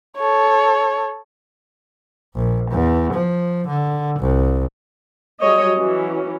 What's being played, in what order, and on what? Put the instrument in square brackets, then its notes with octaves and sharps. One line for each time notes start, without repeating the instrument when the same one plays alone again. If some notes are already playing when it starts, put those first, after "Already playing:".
[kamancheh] A4 C#5
[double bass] A#1
E2
F3
D3
C2
[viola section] F#3 G3 G#4 C#5 D#5
E3 F#3 C#4